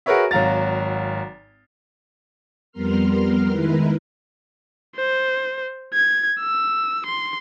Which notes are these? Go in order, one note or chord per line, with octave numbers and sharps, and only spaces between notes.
F#4 G#4 A#4 B4 C#5 E5
G#1 F#3 F5 A#5 A6
F2 G3 B3 A#4 C6 F6
D#3 G#3 E4 A#4 B4
C5
G#6
E6
C6